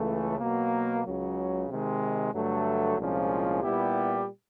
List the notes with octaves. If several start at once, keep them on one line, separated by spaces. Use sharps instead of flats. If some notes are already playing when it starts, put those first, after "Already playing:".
Already playing: C#2 C#3 E3 A3
B2 F#3 A#3
C#2 C#3 F#3
C3 D#3 G#3
G2 D3 F#3 A3
C2 A#2 F3 G#3 C#4
A#2 G3 B3 E4 G4